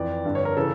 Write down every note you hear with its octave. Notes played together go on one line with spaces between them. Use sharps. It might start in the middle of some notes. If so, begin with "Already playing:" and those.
Already playing: F2 E3 D5
G2 D3
C#5
A#4
C#3 E3 A4